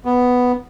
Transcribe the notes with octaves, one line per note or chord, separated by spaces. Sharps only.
B3